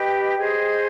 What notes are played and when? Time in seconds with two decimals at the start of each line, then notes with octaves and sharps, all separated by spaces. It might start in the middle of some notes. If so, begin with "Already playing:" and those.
Already playing: G4 B4 D#5 G5
0.38 G#4 C5 D#5